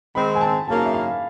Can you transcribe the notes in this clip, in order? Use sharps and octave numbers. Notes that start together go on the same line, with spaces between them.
D#3 G#3 C4 B5
G#5
A5
F#2 C#3 F#3 A#3 D#4 A5
E5
F5